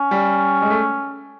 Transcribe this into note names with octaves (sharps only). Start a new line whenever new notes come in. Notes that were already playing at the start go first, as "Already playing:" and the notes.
Already playing: C#4
G3
G#3
A3